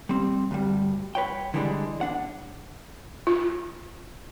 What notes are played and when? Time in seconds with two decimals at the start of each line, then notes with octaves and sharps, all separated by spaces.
0.09 G3 C4
0.51 D2 G2 G3
1.15 B4 C#5 G5
1.54 D3 E3 G3 G#3 C#4 D4
2.01 D4 F#5
3.27 F4